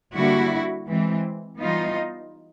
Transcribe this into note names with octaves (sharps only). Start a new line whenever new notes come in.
D3 G3 A#3 E4 F#4
E3 G#3 C4
E3 G3 B3 D#4 F4